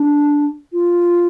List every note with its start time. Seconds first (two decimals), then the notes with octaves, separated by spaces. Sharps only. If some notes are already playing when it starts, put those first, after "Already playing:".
Already playing: D4
0.73 F4